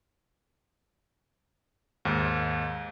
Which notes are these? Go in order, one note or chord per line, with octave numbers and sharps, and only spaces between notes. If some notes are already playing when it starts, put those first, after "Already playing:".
D#2 G#2